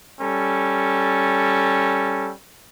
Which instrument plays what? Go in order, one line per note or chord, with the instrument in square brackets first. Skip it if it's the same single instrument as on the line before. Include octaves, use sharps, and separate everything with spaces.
[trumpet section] G3 C#4 A4